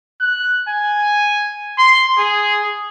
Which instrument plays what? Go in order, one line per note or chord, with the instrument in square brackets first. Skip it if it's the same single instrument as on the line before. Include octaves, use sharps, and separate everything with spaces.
[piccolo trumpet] F#6
G#5
C6
G#4